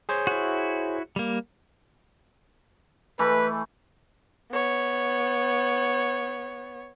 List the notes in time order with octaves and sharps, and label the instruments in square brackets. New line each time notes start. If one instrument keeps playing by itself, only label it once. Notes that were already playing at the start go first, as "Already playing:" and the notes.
[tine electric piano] G#4 C5 C#5
[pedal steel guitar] E4 F#4
G3 A#3
[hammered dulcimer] E3 A3 [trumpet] B4
[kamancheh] B3 C#5